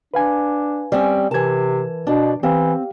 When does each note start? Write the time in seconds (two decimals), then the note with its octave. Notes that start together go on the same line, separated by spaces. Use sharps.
0.14 D4 B4 F5 G#5
0.92 G3 C4 C#4
1.31 C3 E3 A#4 A5 G#6
2.07 B2 D4
2.43 E3 C4 G4 F5